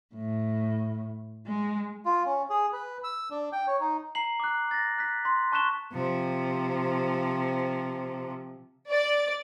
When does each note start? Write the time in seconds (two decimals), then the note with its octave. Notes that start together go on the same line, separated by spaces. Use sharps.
0.15 A2
1.47 G#3
2.05 F4
2.26 C#4
2.50 G#4
2.73 B4
3.04 E6
3.30 D4
3.53 G5
3.67 C#5
3.80 D#4
4.15 A#5 C7 F#7
4.40 D6 F#6
4.71 A6 A#6
4.98 F#6 B6
5.25 C6 B6
5.52 A5 C#6 F#6 B6 E7 G7
5.92 C3 F3
8.89 D5